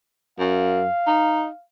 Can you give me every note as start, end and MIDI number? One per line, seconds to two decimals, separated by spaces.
0.39 0.87 42
0.39 1.63 77
1.07 1.48 63